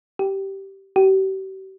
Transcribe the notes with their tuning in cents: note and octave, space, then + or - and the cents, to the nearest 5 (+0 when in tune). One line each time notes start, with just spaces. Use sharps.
G4 -15
G4 -40